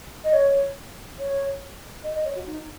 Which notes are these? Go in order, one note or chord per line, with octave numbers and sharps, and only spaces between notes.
D#5
C#5
C#5
D#5
D#5
C#5
F#4
D#4